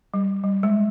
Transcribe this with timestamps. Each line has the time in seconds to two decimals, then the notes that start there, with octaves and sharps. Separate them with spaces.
0.14 G3
0.43 G3
0.63 G#3